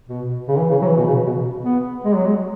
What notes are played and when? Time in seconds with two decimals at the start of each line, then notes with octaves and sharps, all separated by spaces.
0.09 B2
0.48 C#3
0.59 E3
0.71 C#3
0.82 F#3
0.86 E3
0.97 B2
1.07 C#3
1.26 B2
1.65 B3
2.05 G#3
2.16 F#3
2.27 G#3